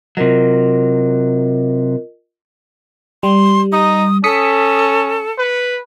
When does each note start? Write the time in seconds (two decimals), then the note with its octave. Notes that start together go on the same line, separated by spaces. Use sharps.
0.17 C3 F#3 F4 A#4 D#5
3.23 G3 C6
3.72 D#4 D#6
4.24 C#4 A4 D#6 B6 C#7
4.79 C#7
5.38 B4